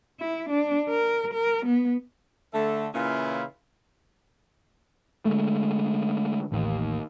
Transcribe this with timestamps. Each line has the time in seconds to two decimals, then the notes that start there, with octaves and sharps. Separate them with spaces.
0.20 E4
0.49 D4
0.89 A#4
1.34 A#4
1.65 B3
2.54 D3 A3 A4
2.94 A#2 C#3 E3 C#4 E4 F4
5.25 D3 G#3 A3
6.52 A1 D#2